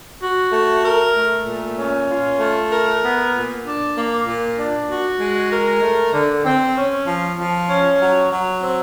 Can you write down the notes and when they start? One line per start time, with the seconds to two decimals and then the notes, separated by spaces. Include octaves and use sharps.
0.21 F#4
0.52 A3
0.84 A#4
1.15 A3
1.46 A#2
1.78 C#4
2.08 F4
2.39 A3
2.71 A#4
3.02 B3
3.33 A#2
3.65 D4
3.95 A#3
4.26 A#2
4.57 D4
4.89 F#4
5.20 G#3
5.51 A#4
5.82 A3
6.13 D3
6.45 C4
6.76 C#4
7.07 F3
7.38 F3
7.69 C#4
8.01 F#3
8.32 F#3
8.62 C4